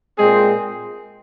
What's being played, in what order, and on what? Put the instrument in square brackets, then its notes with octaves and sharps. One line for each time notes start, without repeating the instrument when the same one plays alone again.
[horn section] A#2 G#3 C4 G#4